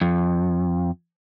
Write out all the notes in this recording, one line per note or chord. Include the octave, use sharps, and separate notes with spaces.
F2